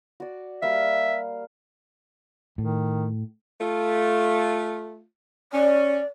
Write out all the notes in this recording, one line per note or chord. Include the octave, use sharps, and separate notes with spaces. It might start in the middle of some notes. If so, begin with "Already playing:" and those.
F#4 D5
G3 A#3 E5 F5
A2 D#3
A3 F4
C#4 D5